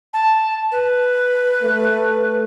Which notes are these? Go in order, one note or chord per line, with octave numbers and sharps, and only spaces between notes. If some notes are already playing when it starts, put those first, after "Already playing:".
A5
B4
A3